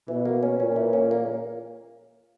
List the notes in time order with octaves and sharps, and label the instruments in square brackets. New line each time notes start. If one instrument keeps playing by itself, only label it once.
[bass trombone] B2 [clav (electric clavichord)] E3
[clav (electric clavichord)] A#3
C#4
[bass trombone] A#2 [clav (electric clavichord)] C#4
[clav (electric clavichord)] E3
C#4
A#3